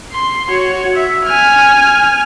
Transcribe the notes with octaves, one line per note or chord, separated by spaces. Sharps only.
C6
F#4 C#5
E5
G#5 F6